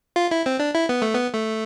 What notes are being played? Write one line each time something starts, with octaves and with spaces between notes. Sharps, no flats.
F4
E4
C4
D4
E4
B3
A3
B3
A3